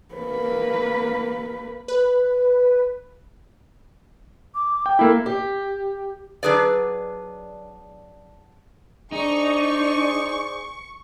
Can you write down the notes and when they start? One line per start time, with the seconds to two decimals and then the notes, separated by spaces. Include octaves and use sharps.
0.15 A#3 B4
1.88 B4
4.55 D6
4.86 G5
4.99 A#3 E4 A4
5.26 G4
6.43 F#3 D4 G#4 B4 D5
9.12 D4 D#4 G#4 C5 D5 C#6